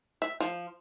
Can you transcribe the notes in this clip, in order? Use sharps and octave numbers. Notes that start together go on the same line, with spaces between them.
E5
F3